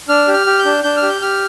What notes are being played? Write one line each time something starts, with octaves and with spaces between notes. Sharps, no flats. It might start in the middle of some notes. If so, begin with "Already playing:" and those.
D4 F6
G4
F6
G4
G6
D4
D4 G6
F6
G4
G6
G4 F6